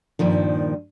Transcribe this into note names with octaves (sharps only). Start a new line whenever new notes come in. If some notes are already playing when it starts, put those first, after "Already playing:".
G2 A#2 D#3 F3